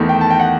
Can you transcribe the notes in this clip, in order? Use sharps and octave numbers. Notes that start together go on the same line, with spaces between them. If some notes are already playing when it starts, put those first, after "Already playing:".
Already playing: E2 D#3 A3
G5
A5
G5
F#5